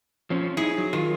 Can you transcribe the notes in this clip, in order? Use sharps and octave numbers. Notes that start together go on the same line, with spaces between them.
F3 C4 C#4
D#4 E4 G#4
F#3
D#3 F4